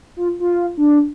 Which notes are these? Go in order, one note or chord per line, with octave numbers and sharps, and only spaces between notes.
F4
F4
D4